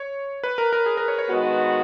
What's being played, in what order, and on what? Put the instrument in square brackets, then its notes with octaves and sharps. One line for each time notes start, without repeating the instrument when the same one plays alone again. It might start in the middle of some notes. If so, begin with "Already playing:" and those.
Already playing: [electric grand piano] C#5
B4
A#4
A#4
G#4
A#4
C#5
C#5
[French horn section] D#3 G#3 B3 F#4 [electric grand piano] B4